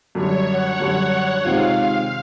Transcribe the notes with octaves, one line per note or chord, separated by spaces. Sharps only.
F#2 D3 G3 C#5
F#5
F#2 D3 G3 F#5
C3 D#3 G#3 C4 F4 F5